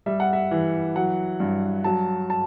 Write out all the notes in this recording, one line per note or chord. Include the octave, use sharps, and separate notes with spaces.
G3 E5
F#5
E5
E3
F#3 F#5
G2
F#3 A5
A5